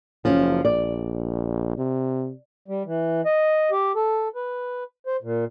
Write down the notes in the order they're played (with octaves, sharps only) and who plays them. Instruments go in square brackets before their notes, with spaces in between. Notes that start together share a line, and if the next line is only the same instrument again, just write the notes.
[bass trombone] F#1 [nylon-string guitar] F3 C#4
[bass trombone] A#1 [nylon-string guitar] D5
[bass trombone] C3
[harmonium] G3
E3
D#5
G4
A4
B4
C5
A#2